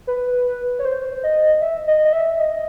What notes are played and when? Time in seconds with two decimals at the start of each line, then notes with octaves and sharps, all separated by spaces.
0.07 B4
0.79 C#5
0.85 C5
1.24 D#5
1.61 E5
1.87 D#5
2.05 D#5
2.13 E5
2.39 D#5